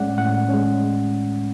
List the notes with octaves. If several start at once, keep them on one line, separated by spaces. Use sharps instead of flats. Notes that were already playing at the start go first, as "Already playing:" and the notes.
Already playing: A2 G#3 C#4 D5 F#5
A2 F#5
G#3 C#4